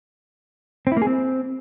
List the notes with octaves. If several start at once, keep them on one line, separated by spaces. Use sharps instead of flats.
C4
E4
A#3
G#4
C4